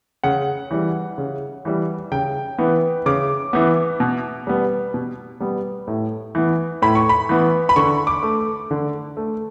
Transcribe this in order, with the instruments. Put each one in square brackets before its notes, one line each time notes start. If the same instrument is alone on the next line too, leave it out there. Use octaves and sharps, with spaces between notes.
[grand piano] C#3 F#5
E3 G3
C#3
E3 G3
C#3 G5
E3 B3
C#3 D6
E3 B3
B2
G3 B3
B2
G3 B3
A2
E3 B3
A2 B5
C#6
B5
E3 B3
B5
D3 C#6
D6
A3
D3
A3